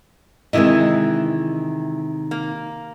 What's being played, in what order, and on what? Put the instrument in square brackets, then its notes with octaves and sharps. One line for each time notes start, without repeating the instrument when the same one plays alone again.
[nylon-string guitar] C3 D#3 G#3 [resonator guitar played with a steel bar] E3 E4 D#5
[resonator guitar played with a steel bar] A#3